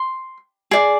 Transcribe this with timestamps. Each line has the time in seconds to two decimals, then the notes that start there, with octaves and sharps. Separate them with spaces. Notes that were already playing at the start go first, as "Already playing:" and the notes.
Already playing: C6
0.71 G#4 D5